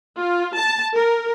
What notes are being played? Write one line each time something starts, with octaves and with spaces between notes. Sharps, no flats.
F4
A5
A#4